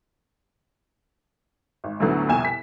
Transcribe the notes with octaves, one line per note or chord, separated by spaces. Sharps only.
G#1
D2 A2 D3 F#3 B3
C2 F2 B2 G#5 E7
B6